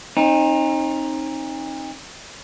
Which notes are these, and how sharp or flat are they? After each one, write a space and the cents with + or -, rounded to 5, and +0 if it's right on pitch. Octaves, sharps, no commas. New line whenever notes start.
C4 +45 D#4 +0